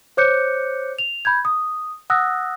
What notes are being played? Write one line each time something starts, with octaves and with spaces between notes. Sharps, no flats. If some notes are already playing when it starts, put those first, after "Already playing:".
C5 C#5 D6 F#6 G6 C#7
F7
B5 G6 G#6
D#6
F#5 D#6 E6 F#6 A#6